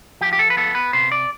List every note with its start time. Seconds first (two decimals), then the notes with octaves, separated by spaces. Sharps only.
0.21 F3 G4
0.33 G4
0.39 A4
0.50 B4
0.57 B3 A4
0.75 B4
0.93 C3 C5
1.12 D5